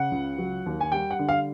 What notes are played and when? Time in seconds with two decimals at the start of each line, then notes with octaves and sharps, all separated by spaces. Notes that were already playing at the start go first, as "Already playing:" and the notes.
Already playing: C#3 F#5
0.12 C#2
0.38 F#3
0.66 D#2
0.81 G#5
0.92 G3 G5
1.11 F#5
1.19 D3
1.29 F5